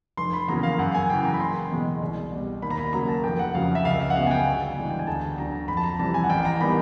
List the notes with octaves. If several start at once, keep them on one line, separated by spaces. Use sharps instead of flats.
F1 C6
B5
E2 C#3 F#3 A#3 A#5
F5
F#2 F#5
G#5
C#3 E3 G5
A#5
B5
F#1 C6
E2 B2 G#3
C2
B2 G3
D#2 B5
A#5
B5
C#3 F#3 A#3 A#5
A5
F1 G5
F#5
F2 C#3 F#3 F5
E5
C#2 F5
E5
F#5
C#3 F#3 B3 F5
G#5
G5
G1
G2 E3 G#3
G5
G#5
D2 A5
D3 F#3 A#5
F2 B5
A5
A#5
C3 E3 G3 A5
G#5
F#5
A1 G5
A#5
D#3 G3 B3 B5